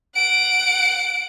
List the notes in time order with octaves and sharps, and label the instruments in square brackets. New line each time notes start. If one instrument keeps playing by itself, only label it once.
[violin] F#5 D7